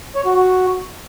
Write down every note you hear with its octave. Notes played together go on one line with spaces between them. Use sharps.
C#5
F#4
F#4